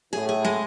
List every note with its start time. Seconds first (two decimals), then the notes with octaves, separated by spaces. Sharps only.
0.13 A2 G#4
0.29 G#4
0.45 G#3